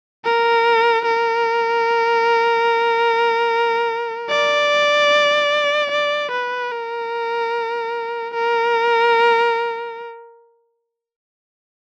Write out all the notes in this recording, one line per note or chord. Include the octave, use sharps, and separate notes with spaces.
A#4
A#4
D5
D5
B4
A#4
A#4